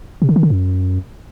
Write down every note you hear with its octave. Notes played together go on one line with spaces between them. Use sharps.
C3
D3
D#3
D3
F#2